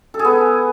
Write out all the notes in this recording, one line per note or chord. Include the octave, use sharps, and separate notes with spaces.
A4
G#4
B3